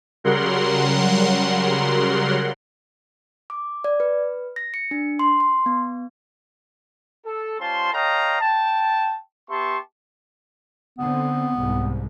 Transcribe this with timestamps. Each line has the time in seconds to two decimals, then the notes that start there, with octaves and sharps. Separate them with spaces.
0.24 C#3 F#3 G3 A#4 F#5 C6
3.50 D6
3.84 D5
4.00 B4
4.56 A#6
4.74 C#7
4.91 D4
5.19 C6
5.40 C6
5.66 B3
7.26 A4
7.60 G3 C#4 F4 C5 A5 C6
7.93 A4 C#5 D#5 F5 G5 A#5
8.41 G5 A5
9.49 B3 G4 E5 A5 C6 C#6
10.99 D3 B3 C4
11.57 C2 G#2